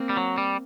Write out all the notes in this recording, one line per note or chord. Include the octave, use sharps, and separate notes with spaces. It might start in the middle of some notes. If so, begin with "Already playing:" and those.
Already playing: A#3 C4
G3
F#3
G3